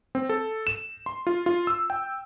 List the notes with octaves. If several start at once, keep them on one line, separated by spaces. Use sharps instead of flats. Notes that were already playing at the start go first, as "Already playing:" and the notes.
C4
A4
E7
C6
F4
F4
E6
G5